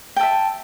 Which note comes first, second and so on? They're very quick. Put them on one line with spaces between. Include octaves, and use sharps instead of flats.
G5 A5 E5